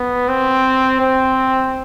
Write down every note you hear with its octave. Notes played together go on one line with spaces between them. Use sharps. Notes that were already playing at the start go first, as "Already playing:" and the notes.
Already playing: B3
C4
C4